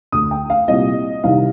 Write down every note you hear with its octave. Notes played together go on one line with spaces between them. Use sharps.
D2 D3 D#6
G5
F5
C2 A#2 D#5
C2 C3 D#3 F5